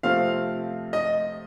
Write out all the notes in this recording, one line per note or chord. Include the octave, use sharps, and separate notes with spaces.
C3 F3 A3 C4 F5
D#5